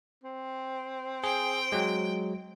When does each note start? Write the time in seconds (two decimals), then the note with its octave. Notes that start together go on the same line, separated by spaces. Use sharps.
0.23 C4
1.24 G#4 G5
1.72 F#3 G#3